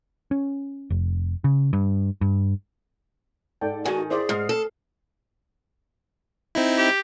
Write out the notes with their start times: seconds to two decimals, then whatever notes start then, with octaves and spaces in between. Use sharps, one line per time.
0.31 C#4
0.90 F1
1.44 C#3
1.73 G2
2.21 G2
3.61 G#2 A4 D5 G5
3.85 D#3 F#4 G#4 F#5 G#5
4.10 E4 G#4 C5 D5 E5
4.29 G#2 D#6 F6 C7
4.49 A4
6.55 C4 D#4 E4
6.78 G4